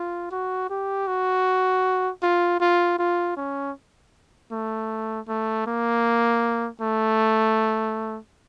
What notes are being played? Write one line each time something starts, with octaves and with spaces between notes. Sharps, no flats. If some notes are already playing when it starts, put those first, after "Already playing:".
Already playing: F4
F#4
G4
F#4
F4
F4
F4
C#4
A3
A3
A#3
A3